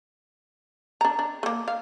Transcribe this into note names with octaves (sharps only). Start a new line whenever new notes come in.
D4 A#5
D4
A3 A#3
F5